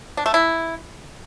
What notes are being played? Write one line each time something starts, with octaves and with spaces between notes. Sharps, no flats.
D4
A3
E4